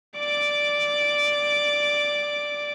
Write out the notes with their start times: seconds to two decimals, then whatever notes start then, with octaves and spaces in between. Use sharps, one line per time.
0.18 D5 D6